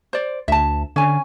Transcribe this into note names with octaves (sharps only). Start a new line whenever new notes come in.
C5 D5
D2 E5 A5
D3 C#4 G#5